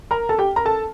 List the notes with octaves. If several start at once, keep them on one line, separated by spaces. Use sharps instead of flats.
A#4 A#5
A4 A5
G4 G5
A#4 A#5
A4 A5